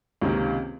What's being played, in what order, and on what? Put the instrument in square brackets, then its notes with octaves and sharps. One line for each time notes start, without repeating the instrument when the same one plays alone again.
[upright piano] C#2 C3 D#3 A#3 C#4